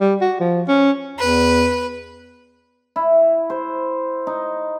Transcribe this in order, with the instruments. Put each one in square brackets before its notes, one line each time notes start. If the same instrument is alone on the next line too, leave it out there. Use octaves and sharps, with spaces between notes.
[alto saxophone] G3
F#4
F3
C#4
[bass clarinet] E2 [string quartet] B4
[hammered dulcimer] E4
C5
D#4